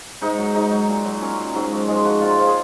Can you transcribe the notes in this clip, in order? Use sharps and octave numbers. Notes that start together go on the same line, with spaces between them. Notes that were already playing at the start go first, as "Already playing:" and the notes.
G#2 D#4
F#3
G#2 D#4
F#3
A#2
F#3
A#2 C#4
F#3
G#2 F#3
F3
G#2 G#3
F3 F#4
A#2 F4
D#4
F3 F4
G#4